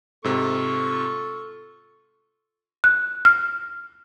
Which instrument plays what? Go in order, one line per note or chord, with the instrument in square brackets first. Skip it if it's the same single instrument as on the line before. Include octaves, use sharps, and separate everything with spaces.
[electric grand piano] G#2 C3 [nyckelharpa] F4 C#6 [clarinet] A4
[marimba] F#6
F6